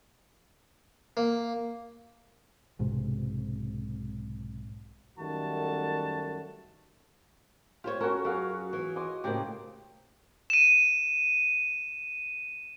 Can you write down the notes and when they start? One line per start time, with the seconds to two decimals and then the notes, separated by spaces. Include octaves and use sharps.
1.17 A#3
2.79 B1 G#2 C3 G#3
5.19 F#2 D#3 G3 A3 F#4 A5
7.84 F4 G4 C5 C#5
8.00 C#4 F#4 A4 A#4
8.25 F#2 F#4 G#4 F5
8.73 E3
8.96 D#5 C6 D6
9.24 A2 C#3 A#3 G4 C5
10.50 D#7 E7